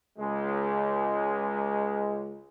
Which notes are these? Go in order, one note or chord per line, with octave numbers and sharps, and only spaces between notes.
C#2 G#3